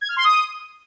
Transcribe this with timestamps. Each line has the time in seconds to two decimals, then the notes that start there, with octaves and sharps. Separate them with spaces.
0.01 G#6
0.09 F6
0.16 C6
0.24 D#6